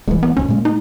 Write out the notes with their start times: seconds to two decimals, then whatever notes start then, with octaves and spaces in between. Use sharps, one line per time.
0.08 D#1 E3 G#3
0.23 B3
0.37 F1 D2 C#4
0.48 A#2 G#3 A#3
0.65 D#4